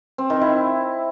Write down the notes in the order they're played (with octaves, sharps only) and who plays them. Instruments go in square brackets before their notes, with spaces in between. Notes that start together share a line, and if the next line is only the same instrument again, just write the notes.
[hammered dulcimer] C4
D#3
E4